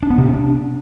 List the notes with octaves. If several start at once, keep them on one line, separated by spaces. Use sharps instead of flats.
D4
B3
C3
C#4
D4